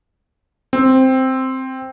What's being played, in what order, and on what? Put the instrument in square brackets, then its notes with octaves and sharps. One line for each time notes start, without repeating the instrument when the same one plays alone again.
[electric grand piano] C4